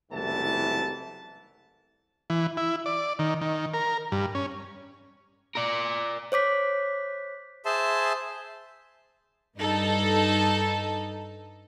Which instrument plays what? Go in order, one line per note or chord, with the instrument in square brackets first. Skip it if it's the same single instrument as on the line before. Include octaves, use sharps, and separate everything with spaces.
[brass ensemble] F#1 C2 G#2 E3 A3 A5
[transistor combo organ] E3
E4
D5
D#3
D#3
A#4
G2
C#4
[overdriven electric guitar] A#4 D5
[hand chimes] C5 C#5 D6 B6
[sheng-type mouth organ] G#4 C5 E5 A5 C6
[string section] G2 D#4 A4